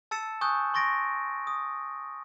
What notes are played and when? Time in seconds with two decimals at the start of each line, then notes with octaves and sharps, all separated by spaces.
0.11 A5 E6 A6 C#7 E7
0.41 G#5 C#6 D#6 F#6 G6
0.74 C6 C#6 A6 A#6 D7
1.47 D#6